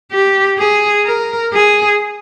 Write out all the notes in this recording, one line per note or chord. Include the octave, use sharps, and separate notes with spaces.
G4
G#4
A#4
G#4